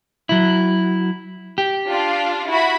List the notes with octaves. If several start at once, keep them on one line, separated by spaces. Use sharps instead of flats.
F#3 E4
G4
D4 F4
E4 F#4 B5